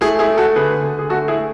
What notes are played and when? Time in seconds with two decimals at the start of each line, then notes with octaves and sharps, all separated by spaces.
0.01 A3 E4 G#4
0.19 E4 G#4
0.28 A3
0.38 F#4 A4
0.56 D3 G#4 B4
0.82 D3
0.99 G#4
1.10 A3 F#4 A4
1.28 E4 G#4
1.37 A3